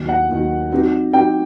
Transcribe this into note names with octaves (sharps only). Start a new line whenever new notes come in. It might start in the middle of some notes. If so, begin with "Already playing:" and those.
Already playing: D#2 D#3 F#3
F#5
D#2 D#3 F#3
F#3 C4 D#4 G4
F#3 C4 D#4 G4 G5